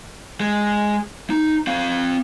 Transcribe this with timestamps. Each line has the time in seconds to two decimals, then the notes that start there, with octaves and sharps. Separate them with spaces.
0.40 G#3
1.30 D#4
1.67 C4 F5